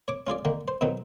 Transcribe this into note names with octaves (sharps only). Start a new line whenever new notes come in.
C#5 D6
C#4 F4 G#4 D5
D3 D#3 A#3
C5
F2 B2 D#3 F#3 D#4